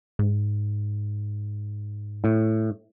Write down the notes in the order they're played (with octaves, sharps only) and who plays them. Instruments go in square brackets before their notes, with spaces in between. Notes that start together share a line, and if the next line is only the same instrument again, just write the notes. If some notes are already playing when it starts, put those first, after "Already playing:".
[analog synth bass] G#2
[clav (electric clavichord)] A2